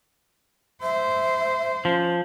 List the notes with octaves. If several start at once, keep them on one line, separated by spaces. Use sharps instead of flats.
C5 E5
F3 C#4